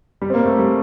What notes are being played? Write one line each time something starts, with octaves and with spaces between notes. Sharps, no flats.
G3
C4
A#3
A3
G3